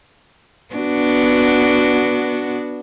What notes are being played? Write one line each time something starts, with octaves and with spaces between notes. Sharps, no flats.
B3 D4 F#4